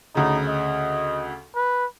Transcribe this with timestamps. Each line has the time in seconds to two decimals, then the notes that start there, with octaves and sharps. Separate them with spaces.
0.15 D2 C#3 D#4
0.48 D#5
1.55 B4